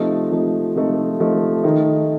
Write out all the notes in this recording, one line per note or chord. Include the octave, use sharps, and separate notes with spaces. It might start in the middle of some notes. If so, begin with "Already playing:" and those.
Already playing: C3 F3 A3 D#4
C3 F3 A3 D#4
C3 F3 A3 D#4
C3 F3 A3 D#4
D#3 A3 D#4